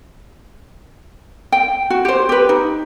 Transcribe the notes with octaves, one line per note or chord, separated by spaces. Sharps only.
G5
F#4
G4 C5
G4 B4
D#4